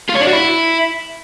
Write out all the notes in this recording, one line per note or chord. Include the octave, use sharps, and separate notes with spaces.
F4
C#5
D4
F#4
E4